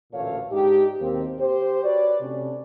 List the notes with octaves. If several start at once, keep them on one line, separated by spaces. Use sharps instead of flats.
A1 D2 A#2 A3 C#5 F5
G#2 D4 D#4 G4
D#2 B2 A#3 C4
G4 C5
F#4 B4 C#5 D5
C3 A3 C#4 D4